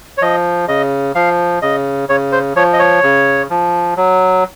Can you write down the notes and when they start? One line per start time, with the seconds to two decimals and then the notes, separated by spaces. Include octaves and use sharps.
0.17 C#5
0.21 F3 D#5
0.68 C#3 D#5
1.15 F3 F5
1.62 C#3 D#5
2.09 C#3 C#5
2.32 C5
2.55 F3 C#5
2.73 D#5
2.79 C#5
3.03 C#3
3.50 F3
3.97 F#3